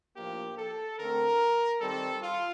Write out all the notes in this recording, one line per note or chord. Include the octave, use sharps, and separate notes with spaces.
A2 F3 A#3 D4 G4
A4
D3 A3 C4 A#4
D#3 G3 C4 A4
F4